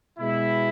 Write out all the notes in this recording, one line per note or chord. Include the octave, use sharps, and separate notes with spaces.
B2 G#3 E4